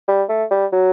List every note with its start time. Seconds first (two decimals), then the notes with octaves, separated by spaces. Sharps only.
0.08 G3
0.29 A3
0.51 G3
0.72 F#3